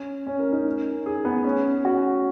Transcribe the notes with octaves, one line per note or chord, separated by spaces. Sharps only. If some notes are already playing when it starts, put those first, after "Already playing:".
Already playing: C#4
C#4
A#4
D#4
G#4
B3
C#4
F#4